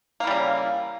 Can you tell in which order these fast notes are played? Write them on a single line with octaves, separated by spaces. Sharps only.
A#3 E3 G3 C#3